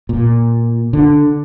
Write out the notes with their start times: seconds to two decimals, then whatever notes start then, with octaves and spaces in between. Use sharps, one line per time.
0.09 A#2
0.93 D3